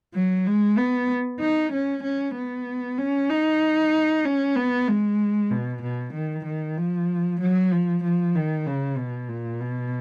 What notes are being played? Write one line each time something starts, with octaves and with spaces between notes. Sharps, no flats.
F#3
G#3
B3
D#4
C#4
C#4
B3
C#4
D#4
C#4
B3
G#3
B2
B2
D#3
D#3
F3
F#3
F3
F3
D#3
C#3
B2
A#2
B2